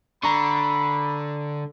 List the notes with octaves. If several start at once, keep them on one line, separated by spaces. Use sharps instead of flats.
D3 A#5 B5 C#6